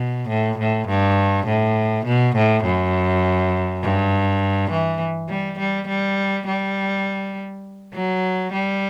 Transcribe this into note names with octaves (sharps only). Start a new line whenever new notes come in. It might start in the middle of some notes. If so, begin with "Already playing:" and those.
Already playing: B2
A2
A2
G2
A2
B2
A2
F#2
G2
E3
G3
G3
G3
G3
F#3
G3